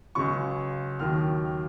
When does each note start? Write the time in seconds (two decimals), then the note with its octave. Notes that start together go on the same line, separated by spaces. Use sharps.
0.15 C#2 C#3 F#3 C#6
1.00 D#2 D#3 F#3 F6